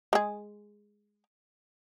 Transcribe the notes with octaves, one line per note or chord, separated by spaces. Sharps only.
G#3 G#4